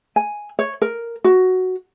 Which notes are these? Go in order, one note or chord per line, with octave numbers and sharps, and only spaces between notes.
G#5
C#5
A#4
F#4